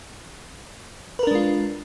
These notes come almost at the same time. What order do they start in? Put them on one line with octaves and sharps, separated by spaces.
B4 A#4 D4 G#3 F4